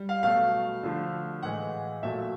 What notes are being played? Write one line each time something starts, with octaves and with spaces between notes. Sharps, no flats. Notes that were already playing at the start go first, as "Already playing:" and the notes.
Already playing: G3
F5
B2 F#3 A3 F5
D3 F3 A3
A2 E3 G#3 F#5
A#2 F#3 A3 E5